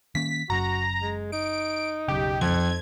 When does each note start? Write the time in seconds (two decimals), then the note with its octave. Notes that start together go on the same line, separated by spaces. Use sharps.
0.15 D#3 A#3 C#4 B6
0.50 F#1 F#2 F#4 A#5
1.02 G#3
1.32 D#4 D7
2.08 B1 F#2 C#3 G4
2.41 F2 G#6